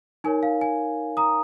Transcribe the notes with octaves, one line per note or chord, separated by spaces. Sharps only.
D#4 A#4 C#5 G#5
F5
G#5
A#5 D#6